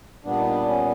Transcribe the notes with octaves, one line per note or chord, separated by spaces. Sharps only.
A#2 G3 B3 D4
D#4
D4
C#4